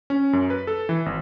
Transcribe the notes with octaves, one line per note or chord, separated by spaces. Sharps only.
C#4
F#2
B4
A4
E3
G#1